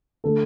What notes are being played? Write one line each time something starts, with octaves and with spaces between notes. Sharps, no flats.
D3 A3 A4